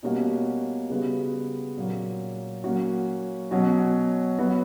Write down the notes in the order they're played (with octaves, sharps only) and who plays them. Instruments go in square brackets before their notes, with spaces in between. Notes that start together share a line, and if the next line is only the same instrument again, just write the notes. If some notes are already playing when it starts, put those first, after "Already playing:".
[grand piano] B2 G3 A#3 C#4 F#4
C#3 G3 B3 F#4
A#2 F#3 A#3 C#4
F#3 A#3 C#4 F#4
B2 F#3 C#4 F#4
F#3 B3 F#4